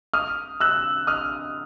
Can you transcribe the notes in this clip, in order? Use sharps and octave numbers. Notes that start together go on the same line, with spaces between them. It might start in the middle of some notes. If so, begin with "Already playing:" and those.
D#6 F6
E6 F#6
D#6 F6